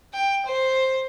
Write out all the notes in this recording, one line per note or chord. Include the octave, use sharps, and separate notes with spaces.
G5
C5